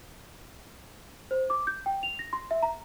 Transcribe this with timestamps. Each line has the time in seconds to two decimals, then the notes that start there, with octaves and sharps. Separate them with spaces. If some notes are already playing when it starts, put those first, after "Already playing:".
1.31 C5
1.50 D6
1.67 G6
1.86 G5
2.03 F7
2.19 A#6
2.33 C6
2.51 E5
2.62 A#5